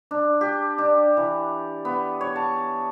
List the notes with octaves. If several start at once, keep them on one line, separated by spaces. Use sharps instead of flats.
D4
G4
D4
E3
B3
C#5
A5